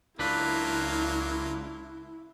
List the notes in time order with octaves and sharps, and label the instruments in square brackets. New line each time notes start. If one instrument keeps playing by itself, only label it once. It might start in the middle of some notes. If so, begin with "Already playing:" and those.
[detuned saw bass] C#2 [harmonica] F#3 A#3 F4 [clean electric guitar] D4 B4 [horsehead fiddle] E4